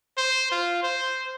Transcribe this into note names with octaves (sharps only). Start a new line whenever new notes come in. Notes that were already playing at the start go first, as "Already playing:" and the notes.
C5
F4
C5